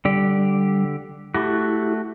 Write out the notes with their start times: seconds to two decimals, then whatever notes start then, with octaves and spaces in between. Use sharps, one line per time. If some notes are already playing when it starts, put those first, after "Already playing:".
0.05 D3 G3 G4
1.35 A3 E4 F#4 G4